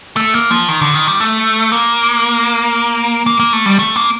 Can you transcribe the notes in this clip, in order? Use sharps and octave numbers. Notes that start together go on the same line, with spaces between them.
A3
A#3
F3
D#3
D3
D#3
G3
A3
A#3
A#3
A#3
A3
G3
A3
A#3